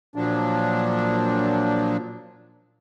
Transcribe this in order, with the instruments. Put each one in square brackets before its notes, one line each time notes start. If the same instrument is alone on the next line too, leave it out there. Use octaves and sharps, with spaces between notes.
[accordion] A#2 F3 F#3 D4